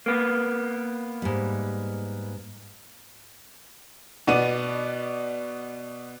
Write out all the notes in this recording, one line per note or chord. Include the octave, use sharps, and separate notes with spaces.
A#3 B3
G#2 G3
B2 B3 D5 D#7